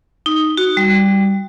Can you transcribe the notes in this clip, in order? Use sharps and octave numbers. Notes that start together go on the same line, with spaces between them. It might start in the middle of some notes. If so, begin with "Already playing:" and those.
D#4
F#4
G3